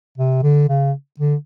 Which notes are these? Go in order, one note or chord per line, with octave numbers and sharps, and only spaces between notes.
C3
D3
C#3
D3